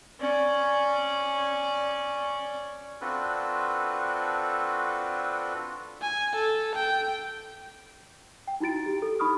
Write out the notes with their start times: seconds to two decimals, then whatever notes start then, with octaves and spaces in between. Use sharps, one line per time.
0.20 C#4 D5
3.01 C4 D4 F4 F#4 A4 B4
6.02 G#5
6.36 A4
6.75 G5
8.47 G5
8.60 D#4 E4 F#4 A6 D7
8.86 G4
9.02 A4
9.19 D#4 B5 C#6 D#6 F6